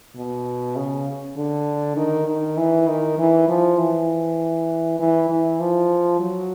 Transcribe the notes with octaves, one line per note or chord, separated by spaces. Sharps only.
B2
C#3
D3
D#3
D#3
E3
D#3
E3
F3
E3
E3
E3
F3
F#3